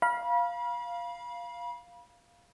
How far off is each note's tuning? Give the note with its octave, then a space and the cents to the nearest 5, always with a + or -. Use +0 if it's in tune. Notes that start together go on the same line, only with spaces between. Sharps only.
F5 +0 B5 -35